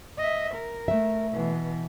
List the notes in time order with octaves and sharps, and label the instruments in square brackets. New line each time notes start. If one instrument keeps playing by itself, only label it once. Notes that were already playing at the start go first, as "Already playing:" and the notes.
[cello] D#5 E5
A#4
[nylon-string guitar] A3 E5
[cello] B2 E3